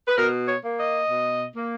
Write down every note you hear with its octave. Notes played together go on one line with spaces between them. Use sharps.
B4
B2 A#4
C#5
A#3
D#5
B2
A#3